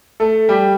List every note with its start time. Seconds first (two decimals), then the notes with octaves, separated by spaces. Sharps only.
0.20 A3 A4
0.49 G3 G4